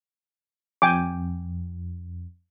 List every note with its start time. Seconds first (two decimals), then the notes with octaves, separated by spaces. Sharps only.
0.82 F2 G5 G#5 D6